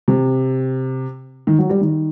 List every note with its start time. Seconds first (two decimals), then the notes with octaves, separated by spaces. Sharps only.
0.08 C3
1.47 D#3
1.58 F#3
1.70 G3
1.81 D#3